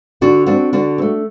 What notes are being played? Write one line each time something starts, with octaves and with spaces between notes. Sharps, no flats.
D3 D4 F#4
A3 C4 D4 F#4
D3 D4 F#4
C4
A3